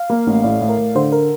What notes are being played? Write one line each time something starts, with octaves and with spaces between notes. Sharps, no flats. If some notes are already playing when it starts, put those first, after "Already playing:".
Already playing: F5
A#3
A1
A2 D5
A2
A#4
A2
D3 C5
A#4